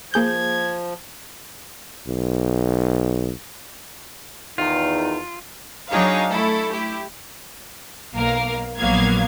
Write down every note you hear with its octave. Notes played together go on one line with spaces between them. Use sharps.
F3 A#3 G#4 G6 G#6
B1
E2 D#3 D#4 F4
F#3 D4 D#4 G#4 C#5 F5
A3 E4 A4
E4 G4
B1 A#3 A#4 F5
A#1 F#3 A#3 B3 F5 G#6